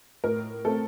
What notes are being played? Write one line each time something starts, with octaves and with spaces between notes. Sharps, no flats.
A2 A#4
A3 C4 A4